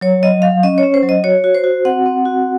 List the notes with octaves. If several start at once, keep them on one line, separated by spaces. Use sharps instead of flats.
F#3 C#5
F#3 D#5
F#3 F5
C#4 D#5
C#5
C#4
C5
F#3
D#5
F#4 C#5
F#4
C5
F#4
C4 F#5
C4
F#4